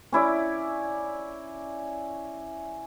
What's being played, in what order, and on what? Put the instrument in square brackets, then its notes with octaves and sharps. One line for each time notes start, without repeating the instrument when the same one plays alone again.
[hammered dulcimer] C#4 E4 D5 E5